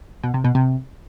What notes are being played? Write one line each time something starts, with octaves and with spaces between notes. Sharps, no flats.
B2
C3
B2
C3